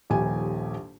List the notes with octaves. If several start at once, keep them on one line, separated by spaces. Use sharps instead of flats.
D#1 A#1 D#2 G4 G#5